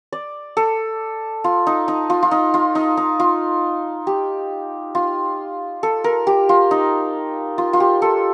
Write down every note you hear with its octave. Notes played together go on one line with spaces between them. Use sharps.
D5
A4
F4
D#4
D#4
F4
F4
D#4
F4
D#4
D#4
F4
G4
F4
A4
A#4
G4
F4
D#4
F4
F4
G4
A4